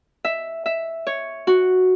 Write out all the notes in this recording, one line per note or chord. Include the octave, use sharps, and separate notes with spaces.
E5
E5
C#5
F#4